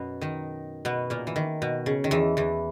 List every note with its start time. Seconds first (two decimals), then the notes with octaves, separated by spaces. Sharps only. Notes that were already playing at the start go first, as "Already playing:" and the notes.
Already playing: F#2 B2 F#3 B3
0.21 D#3 D#4
0.85 B2 B3
1.10 A#2 A#3
1.27 E3
1.36 D#3
1.62 B2
1.86 C#3
2.04 D#3
2.11 E2 E3
2.37 E2 E3